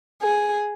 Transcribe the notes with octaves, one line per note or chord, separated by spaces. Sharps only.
G#4